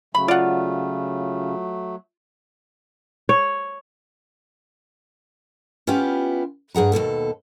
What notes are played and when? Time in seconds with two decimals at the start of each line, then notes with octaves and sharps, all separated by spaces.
0.15 C#3 F#3 A3 B5
0.28 F4 D5 F#5
3.29 C#5
5.87 B3 C#4 E4 F4 G4
6.74 G2 G#4 F#5 A#5
6.92 D#2 G#2 B2 A4